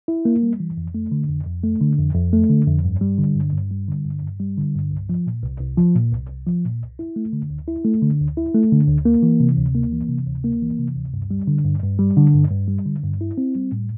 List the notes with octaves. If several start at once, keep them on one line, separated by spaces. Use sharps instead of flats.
E4
A#3
G3
E3
F2
A3
D3
F2
F2
A3
D3
F2
F2
A3
D3
F2
G2
G3
D3
G2
G2
G3
D3
G2
G2
G3
D3
G2
C2
F3
A#2
C2
C2
F3
A#2
C2
C2
F3
A#2
C2
E4
A3
D3
D2
E4
A3
D3
D2
E4
A3
D3
D2
A#3
E3
C3
D2
A#3
E3
C3
D2
A#3
E3
C3
D2
G2
G3
D3
G2
G2
G3
D3
G2
G2
G3
D3
G2
E4
C4
G3
A2